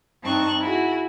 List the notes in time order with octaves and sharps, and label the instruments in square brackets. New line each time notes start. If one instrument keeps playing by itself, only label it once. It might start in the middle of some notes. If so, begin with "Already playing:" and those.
[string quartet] G2 C4 D#4 A5 C#6 F#6
E4 F#4 G#4